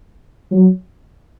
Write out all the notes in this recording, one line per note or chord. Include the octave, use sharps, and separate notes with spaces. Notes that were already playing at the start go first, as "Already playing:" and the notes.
F#3